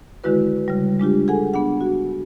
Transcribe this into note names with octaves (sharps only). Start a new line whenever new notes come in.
D3 D#3 G#3 E4 F#4 B4
C#3 G3
G#3 D4 F4 G4
G#4 A4 F#5 G#5
B3 D4 F#5
F#4